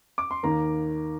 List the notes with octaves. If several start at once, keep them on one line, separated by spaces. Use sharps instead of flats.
D6
C6
D#2 D#3 A#3 A#5